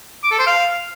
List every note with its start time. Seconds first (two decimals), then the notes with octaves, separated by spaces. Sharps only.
0.24 D6
0.31 A4
0.39 C5
0.47 F5